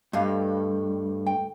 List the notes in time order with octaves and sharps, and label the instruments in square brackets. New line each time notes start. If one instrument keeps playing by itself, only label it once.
[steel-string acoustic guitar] D2 A4 [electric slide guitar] G2 [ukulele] D#5 F5
[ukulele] G5